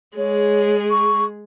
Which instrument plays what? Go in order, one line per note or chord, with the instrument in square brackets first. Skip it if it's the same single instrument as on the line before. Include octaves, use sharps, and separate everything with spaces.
[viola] G#3 G#4 [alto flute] C#5
[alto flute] C#6